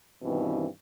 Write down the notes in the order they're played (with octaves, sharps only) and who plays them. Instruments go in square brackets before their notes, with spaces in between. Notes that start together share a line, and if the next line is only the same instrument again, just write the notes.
[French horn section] G2 B2 D#3 E3 C4